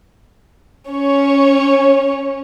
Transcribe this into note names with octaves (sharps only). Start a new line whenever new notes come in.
C#4 C#5